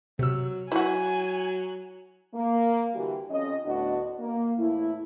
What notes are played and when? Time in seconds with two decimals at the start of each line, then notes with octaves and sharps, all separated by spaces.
0.19 C3 F#3 E6
0.72 F#3 E4 F#4 G#5
2.34 A#3
2.95 D3 E3 G3 F#4 G4
3.29 F2 C#4 D#5
3.64 D2 A2 B3 D4 F#4 D#5
4.19 A#3
4.58 E2 A2 A3 E4